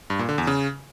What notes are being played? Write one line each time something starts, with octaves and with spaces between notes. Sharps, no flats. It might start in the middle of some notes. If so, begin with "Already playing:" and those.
G2
A#2
D3
E2
C#3